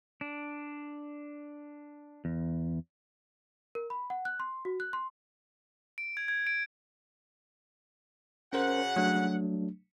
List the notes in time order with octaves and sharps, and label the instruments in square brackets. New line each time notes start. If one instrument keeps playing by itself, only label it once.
[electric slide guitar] D4
E2
[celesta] A#4
B5
F#5
F#6
C6
F#4
F#6
C6
[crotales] D7
G#6
G#6
D7
[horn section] C#3 F#4 F#5 [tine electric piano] C#4 A#4 C5
[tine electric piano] F#3 A3 D4